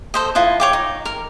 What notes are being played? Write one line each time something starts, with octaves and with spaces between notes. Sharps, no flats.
A4 C5 D#5
E4 F4 D#5 F#5
C#5 G5 D6
D#4
A#4